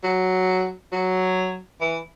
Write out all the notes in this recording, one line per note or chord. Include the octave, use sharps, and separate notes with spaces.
F#3
F#3
E3